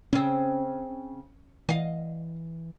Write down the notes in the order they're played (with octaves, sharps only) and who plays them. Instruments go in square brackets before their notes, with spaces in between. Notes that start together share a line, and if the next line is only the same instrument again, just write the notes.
[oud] C#3 C4 [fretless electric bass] C#4
[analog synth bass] E3 [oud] D#5 F5